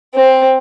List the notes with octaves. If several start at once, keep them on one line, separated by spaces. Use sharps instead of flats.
C4